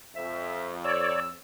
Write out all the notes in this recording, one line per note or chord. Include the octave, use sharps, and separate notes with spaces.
F2 E5
C#5 D5 E6